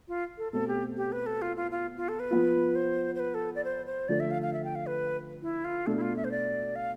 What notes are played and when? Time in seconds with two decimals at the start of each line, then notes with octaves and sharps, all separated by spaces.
0.08 F4
0.38 A4
0.52 B2 A3 C4 A4
0.68 G4
0.97 G4
1.12 B4
1.26 A4
1.42 F4
1.57 F4
1.71 F4
1.97 F4
2.09 A4
2.20 B4
2.31 F3 B3 F4
2.75 C5
3.15 C5
3.20 B4
3.34 A4
3.55 D5
3.65 C5
3.86 C5
4.08 D3 F3 A3 D4 D5
4.20 E5
4.31 F5
4.42 F5
4.53 E5
4.64 G5
4.75 F5
4.87 B4
5.42 E4
5.65 F4
5.87 B2 A3 D4 A4
5.97 E4
6.01 F4
6.16 E5
6.24 C5
6.31 D5
6.76 F5